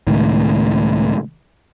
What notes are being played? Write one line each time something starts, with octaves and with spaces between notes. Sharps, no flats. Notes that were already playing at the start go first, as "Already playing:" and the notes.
C#2 A2 D#3